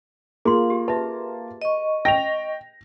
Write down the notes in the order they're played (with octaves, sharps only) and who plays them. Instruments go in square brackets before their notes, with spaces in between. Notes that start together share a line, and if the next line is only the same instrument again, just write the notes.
[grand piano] A#3 F4 [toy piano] G#4 C6
[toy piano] G4
[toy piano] B4 E5 [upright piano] A5
[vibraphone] D#5 C#6
[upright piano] G5 [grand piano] A#6 F7